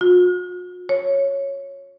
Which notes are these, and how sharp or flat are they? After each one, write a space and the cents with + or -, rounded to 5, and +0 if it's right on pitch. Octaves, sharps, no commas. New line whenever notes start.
F#4 -45
C#5 -5